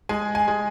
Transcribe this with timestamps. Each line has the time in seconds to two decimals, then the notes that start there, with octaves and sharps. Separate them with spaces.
0.09 G#3 G#5
0.35 G#5
0.48 G#3